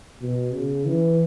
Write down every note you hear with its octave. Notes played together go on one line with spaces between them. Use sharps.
B2
C#3
E3